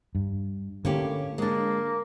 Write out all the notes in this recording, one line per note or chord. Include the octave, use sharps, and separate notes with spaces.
G2
A2 D3 A#3 C#4 G4
G#3 A#3 D4